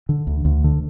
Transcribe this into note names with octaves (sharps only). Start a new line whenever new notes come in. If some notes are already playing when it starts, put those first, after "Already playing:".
D3
D2
D2
D3